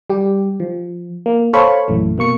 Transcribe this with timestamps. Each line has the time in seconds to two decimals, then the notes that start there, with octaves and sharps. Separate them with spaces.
0.10 G3 G4
0.60 F3
1.26 A#3
1.53 A4 C5 C#5 F5 B5 C#6
1.88 A#1 F#2 E3 A3
2.18 B2 A#3 C#6 C#7